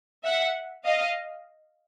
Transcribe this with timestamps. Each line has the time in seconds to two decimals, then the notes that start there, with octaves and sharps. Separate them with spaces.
0.24 E5 F#5
0.85 D#5 F5